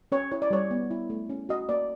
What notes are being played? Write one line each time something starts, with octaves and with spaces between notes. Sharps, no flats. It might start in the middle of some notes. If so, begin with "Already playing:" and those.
C#4 C#5
E4 C#5
D5
G3 C#5
B3
E4
A3
C#4
F#4 D#5
A#3 D5